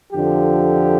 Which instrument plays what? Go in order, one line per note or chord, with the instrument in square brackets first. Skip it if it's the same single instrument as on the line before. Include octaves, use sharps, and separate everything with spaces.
[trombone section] F2 D3 F3 G4